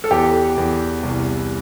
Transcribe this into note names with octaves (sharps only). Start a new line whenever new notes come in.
A4
E2 G4
E2
C2